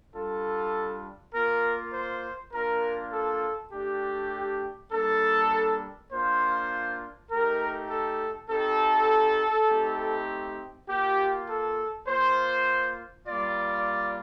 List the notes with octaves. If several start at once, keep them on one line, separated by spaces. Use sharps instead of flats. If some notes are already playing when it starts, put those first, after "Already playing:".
G3 D4 F4 A4
A#3 F4 A#4
C5
A#3 D4 F4 A#4
A4
A3 D4 G4
G3 A#3 D4 A4
A#3 D4 F4 C5
A3 D#4 G4 A#4
A4
C4 D#4 G4 A4
A3 C4 D#4 G4
A#3 F4 G4
A4
A#3 F4 C5
G3 A#3 F4 D5